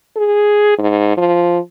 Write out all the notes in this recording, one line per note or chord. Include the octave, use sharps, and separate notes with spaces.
G#4
G#2
F3